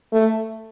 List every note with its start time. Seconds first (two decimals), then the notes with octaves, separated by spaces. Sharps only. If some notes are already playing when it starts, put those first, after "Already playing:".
0.13 A3